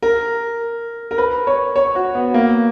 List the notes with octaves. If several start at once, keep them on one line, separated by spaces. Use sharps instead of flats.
A#4
A#4
B4
C#5
C#5
F#4
B3
A#3